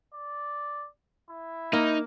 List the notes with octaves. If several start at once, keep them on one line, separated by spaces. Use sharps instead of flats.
D5
E4
A#3 D#4